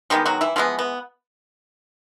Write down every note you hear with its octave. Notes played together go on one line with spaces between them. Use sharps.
D#3 G3 G#3 B3 G4
F#3 F#4
E3 E4
E3 F3 G#3 B3 F4
B3